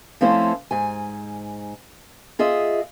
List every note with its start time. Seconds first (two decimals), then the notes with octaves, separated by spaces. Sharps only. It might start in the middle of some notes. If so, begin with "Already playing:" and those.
0.21 F3 A3 C4 C#4 E4 C5
0.71 G#2 G#5
2.39 F4 G#4 D#5 E5